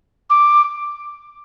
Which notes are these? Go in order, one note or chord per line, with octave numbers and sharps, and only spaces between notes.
D6